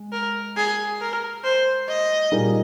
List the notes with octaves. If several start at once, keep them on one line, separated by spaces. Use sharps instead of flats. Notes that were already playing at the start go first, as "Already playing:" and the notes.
Already playing: G#3
A#4
G#4
A#4
C5
D#5
A#2 G3 A#3 D#4 G#4